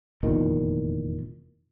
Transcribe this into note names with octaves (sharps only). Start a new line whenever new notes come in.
F1 E2 A#2 D#3